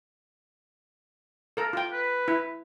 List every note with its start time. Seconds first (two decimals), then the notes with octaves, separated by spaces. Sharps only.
1.57 A4 A#4
1.73 F4 G5
1.93 B4
2.28 E4